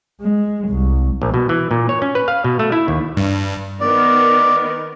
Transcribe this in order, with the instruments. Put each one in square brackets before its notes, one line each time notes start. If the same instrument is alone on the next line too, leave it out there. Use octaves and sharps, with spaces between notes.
[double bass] G#3
C2
[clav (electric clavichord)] A#1
B2
E3
A#2
C#5
C#4
B4
F5
B2
A3
E4
D#2
[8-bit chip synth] G2
[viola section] D#3 B3 A#4 [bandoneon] D5